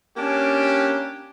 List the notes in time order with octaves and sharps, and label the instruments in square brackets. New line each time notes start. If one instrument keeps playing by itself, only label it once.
[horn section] A#3 C#4 D4 G4